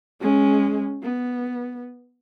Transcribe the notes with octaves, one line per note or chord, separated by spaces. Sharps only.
G#3 C#4
B3